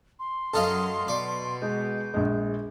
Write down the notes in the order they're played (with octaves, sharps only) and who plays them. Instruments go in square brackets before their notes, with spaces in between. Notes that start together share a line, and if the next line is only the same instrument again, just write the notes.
[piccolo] C6
[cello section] F#2 F#3 [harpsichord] A4 D#5 F5 [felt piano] A5
[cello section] B2 [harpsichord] D5
[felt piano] G#3 [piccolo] G6
[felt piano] A#1 G#3